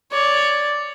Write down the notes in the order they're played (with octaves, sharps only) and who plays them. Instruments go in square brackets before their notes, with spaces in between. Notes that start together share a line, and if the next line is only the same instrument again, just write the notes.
[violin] C#5 [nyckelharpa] D5